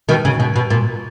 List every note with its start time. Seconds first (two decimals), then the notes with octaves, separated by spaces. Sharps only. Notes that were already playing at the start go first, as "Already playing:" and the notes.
0.09 B2 D#3
0.25 C#3
0.40 B2
0.56 B2
0.70 A#2